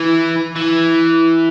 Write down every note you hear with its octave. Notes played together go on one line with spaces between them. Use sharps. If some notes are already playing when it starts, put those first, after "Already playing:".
Already playing: E3
E3